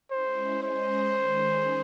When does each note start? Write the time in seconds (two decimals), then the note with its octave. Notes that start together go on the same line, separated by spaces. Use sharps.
0.11 G#3 C#4 E4 C5
0.63 G#3 C#4 G#4 C5 D#5
1.13 D#3 G#3 C#4 G#4